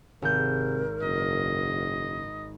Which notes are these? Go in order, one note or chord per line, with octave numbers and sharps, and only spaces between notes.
G#1 C3 A#4 G6
F#1 D#5